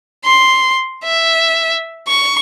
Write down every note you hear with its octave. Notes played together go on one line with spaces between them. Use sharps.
C6
E5
C#6